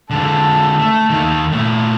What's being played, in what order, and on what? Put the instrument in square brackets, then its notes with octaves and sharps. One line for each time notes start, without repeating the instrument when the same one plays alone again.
[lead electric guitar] D3 G#3 [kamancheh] A4
[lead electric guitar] A3
D#2 D#3
A#2 A3